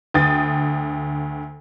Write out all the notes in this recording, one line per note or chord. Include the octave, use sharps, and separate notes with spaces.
D2 G5 D#6 A6